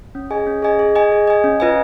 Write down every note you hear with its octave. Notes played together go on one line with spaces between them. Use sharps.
C#4
G#4 D#5 G#5
C#4
G#4 D#5 G#5
G#4
D#5 G#5
G#4
D#5 G#5
C#4
F4 B4 D#5 G#5